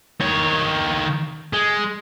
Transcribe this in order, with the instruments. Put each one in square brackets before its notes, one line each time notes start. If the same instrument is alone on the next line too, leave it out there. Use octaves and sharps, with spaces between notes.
[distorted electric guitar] D#3 C#5
G#3